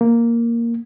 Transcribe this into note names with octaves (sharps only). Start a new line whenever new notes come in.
A#3